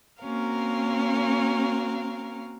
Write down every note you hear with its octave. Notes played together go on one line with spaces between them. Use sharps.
A#3 C4 C#4 F#4 A#4 F5